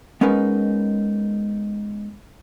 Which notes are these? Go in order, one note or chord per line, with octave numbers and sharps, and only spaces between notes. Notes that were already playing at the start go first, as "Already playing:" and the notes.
G#3 B3 C#4 D#4 A#4 B4